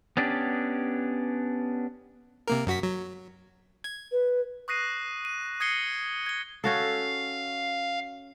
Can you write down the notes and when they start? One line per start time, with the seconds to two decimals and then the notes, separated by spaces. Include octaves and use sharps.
0.17 B3 C#4 D4 G4
2.48 C3 A#3 A#4
2.67 F#2 F#4 B6
2.83 F#3
3.84 G#6
4.12 B4
4.68 C#6 D#6 F#6 A#6 C7 D#7
5.25 D#7
5.60 D#6 G#6 A#6 C7 C#7 G7
6.26 G#6 G7
6.64 C#4 F#4 A4 F5